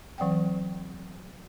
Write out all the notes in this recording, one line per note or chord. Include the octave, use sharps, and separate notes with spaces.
E3 F#3 C4 F#5 G5